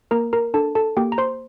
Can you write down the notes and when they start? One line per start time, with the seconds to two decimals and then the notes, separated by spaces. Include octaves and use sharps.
0.11 A#3 A#4 A#5
0.33 A#4 A#5
0.54 D4 A4 A5
0.75 A4 A5
0.97 A#3 G4 G5
1.12 A#5
1.18 C5 C6